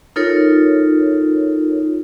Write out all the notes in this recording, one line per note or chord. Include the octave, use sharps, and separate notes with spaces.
D#4 F4 A4 A#4 C#5